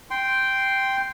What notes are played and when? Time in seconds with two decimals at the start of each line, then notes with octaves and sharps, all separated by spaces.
0.11 G5 C6